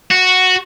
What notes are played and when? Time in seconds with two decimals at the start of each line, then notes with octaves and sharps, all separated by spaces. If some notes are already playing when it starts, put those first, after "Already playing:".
0.11 F#4